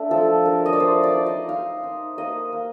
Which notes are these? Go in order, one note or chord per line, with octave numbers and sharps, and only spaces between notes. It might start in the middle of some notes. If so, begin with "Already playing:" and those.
Already playing: A3 D4
F3 A4
D4 A#4
D#5
D5
A3 C5
D5
D#4
D#5
D#4 F5
D#4
A#3 D#5
A#3